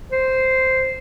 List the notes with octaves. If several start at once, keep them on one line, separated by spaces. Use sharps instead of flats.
C5